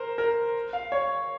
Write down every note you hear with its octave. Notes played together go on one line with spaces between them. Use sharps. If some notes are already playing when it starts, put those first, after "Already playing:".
Already playing: A#4 C5
A#4
F5
C#5